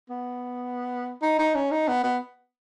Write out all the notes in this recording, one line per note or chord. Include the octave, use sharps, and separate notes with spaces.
B3
D#4
D#4
C#4
D#4
B3
B3